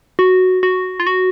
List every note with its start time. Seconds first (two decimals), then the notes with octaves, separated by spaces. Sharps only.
0.19 F#4
0.63 F#4
1.00 F4
1.07 F#4